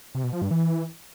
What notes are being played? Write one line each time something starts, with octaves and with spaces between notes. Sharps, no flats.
C3
B2
F3
G2
E3